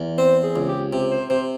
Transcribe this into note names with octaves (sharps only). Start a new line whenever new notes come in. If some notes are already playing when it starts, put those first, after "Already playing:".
Already playing: E2
C4 C5
G#4
C#2
G4
C3 G4
C5
C3 C5